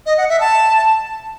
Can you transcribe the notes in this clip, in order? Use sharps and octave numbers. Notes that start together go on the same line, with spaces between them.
D#5
F#5
E5
A5